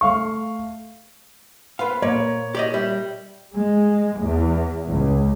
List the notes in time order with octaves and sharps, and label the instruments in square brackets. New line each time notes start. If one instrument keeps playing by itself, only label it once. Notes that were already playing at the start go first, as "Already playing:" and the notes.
[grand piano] A3 F5 C#6
[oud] B3 C4 B4 [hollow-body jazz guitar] F5
[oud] A#2 [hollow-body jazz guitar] A#3 [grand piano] C#5
[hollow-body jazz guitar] G4 D5 D#5
G3 E5
[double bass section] G#3
E2
C#2